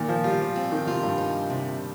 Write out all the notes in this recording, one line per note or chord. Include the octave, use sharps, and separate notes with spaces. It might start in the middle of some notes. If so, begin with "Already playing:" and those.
Already playing: A#2 D#3
F3
G3 F4
F3
C4
D#3
C3 F4
G2
D#4
C3